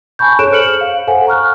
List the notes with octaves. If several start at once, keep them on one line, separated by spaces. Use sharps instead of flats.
G#5 A5 B5 C#6 G6
G#4 A4 C#5 F#6 D7 E7
C5 F6 C#7 F#7
F5
A4 C5 F5 F#5 G#5
A#5 C#6 F6 F#6